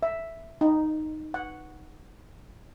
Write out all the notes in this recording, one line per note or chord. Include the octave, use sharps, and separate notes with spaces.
E5
D#4
F#5